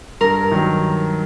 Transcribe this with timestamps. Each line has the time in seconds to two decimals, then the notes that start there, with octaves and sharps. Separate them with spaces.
0.21 G2 A#4
0.52 D#3 F#3